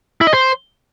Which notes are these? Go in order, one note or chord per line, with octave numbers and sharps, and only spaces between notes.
E4
D#5
C5